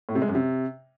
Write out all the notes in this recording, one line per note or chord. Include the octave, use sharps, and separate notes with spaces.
A2
C3
G#3
F#2
C3